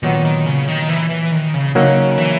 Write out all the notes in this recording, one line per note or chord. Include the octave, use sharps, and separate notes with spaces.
A#2 D#3 F#3 B3 F#4
D#3
C#3
D#3
E3
E3
D#3
C#3
C#3 F#3 A#3 D#4
E3